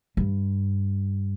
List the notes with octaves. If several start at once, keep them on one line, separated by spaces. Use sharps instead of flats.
G2